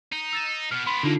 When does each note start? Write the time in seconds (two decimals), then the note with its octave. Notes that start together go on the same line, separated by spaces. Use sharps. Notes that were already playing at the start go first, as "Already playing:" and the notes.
0.12 D#4
0.33 E6 A6 E7
0.71 B2 B3 F6
0.86 B3 D4 B5 C6
1.03 D3 E3 A#3 D#4 F4